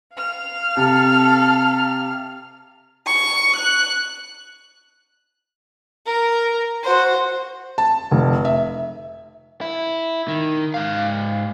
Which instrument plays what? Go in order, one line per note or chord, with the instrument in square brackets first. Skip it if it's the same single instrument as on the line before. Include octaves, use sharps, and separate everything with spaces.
[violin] F5 F6
[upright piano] C3 [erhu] A4
[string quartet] C#6
F#6
[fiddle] A#4
F#4 C5
[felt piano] A5
F1
E5
[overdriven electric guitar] E4
D#3
G#2 F5